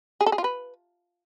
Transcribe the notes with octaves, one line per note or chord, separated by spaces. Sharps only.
G#4
A4
G#4
F4
B4